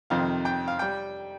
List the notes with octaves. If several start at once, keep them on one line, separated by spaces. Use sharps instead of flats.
F2 C3 D#3 F5
G5
F5
G3 G5